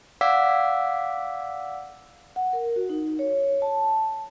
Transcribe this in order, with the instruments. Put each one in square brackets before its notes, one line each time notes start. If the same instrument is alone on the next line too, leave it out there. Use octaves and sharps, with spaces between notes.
[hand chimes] D5 F5 F#5 D6 E6 B6
[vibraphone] F#5
A#4
F#4
D#4
C#5
A5